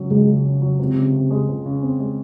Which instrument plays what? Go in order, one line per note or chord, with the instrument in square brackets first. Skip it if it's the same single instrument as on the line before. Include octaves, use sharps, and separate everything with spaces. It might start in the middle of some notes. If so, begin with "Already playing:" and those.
Already playing: [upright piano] C#2 C#3 F#3 C#4
[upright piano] C#2 [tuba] G#3
[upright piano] C#3
C#4
F#3
[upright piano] C#2 [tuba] C3
[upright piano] C#3
C4
G#3
C#2
C#3
C4
G#3